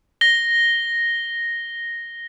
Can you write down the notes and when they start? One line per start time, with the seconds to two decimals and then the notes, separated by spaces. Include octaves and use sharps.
0.21 A#6 G7